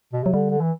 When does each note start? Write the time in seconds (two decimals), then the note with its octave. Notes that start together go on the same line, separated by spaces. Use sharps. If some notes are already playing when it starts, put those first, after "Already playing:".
0.13 B2
0.23 C3 F#3
0.33 D3 G3
0.50 D3
0.61 E3